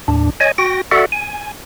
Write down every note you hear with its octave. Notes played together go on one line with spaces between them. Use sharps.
D#2 A2 D4
C#5 D#5 G#5
F#4 G5 A#6
F#4 A4 D5 E5 F#5
G#5